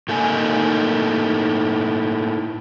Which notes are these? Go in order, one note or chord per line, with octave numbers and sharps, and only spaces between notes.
A2 A3 A#3 D#4 G#5